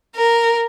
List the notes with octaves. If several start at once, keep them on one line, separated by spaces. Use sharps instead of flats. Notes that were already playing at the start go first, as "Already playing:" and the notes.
A#4